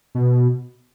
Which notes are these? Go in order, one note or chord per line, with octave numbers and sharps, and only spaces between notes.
B2